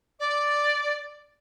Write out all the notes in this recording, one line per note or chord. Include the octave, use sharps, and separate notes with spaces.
D5